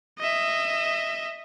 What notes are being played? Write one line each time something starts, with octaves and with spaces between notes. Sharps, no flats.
D#5 E5